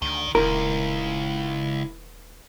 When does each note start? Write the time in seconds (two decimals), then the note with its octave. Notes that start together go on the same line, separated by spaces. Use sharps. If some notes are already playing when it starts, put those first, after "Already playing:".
0.02 D2 D#3
0.35 D#1 C#2 E4 A#4